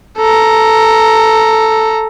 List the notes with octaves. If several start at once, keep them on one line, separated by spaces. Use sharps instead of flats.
A4 A#5